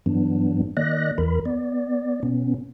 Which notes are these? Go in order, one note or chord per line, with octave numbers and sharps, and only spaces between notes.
G2 E3 F#3 B3 D4
D#3 A#3 D5 D#5 F#6 A#6
E2 E3 A#4 B5
B3 D5
B2 B3 C#4